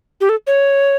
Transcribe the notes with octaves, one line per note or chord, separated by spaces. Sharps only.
G4
A4
C#5